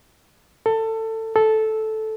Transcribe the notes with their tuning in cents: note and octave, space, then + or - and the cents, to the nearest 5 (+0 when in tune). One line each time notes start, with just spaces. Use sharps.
A4 +20
A4 -10